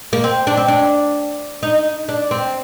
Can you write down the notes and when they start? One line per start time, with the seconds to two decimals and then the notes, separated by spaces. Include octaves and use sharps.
0.13 A#3
0.24 C4
0.47 D4
0.57 C4
0.68 D4
1.63 D#4
2.09 D4
2.31 C4